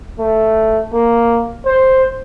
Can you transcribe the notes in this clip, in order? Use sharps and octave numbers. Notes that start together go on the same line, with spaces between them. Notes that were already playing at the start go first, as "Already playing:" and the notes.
A3
A#3
C5